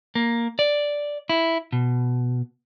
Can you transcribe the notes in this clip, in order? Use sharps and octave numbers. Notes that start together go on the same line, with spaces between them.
A#3
D5
E4
B2